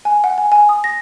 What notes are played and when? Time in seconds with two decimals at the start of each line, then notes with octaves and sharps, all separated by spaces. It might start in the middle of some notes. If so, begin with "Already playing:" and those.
0.05 G#5
0.24 F#5
0.38 G#5
0.52 G#5
0.69 D#6
0.84 A#6